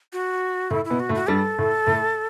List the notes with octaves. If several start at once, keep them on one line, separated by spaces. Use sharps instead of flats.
F#4
A2 A3 E4
E4
B2 B3
F#4
A2 A3
F#4
G2 G3 A4
A2 A3
A2 A3